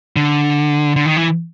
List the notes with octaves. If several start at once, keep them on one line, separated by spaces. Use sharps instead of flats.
D3
D3
D#3
E3